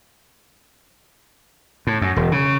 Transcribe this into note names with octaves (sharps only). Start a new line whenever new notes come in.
A2
F#2
E1
C#3